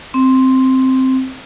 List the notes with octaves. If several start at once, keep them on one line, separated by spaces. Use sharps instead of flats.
C4